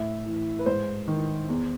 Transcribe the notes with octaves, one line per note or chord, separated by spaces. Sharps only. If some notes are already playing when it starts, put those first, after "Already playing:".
Already playing: A2 E5
E3
B4
G#2 C5
D#3
E2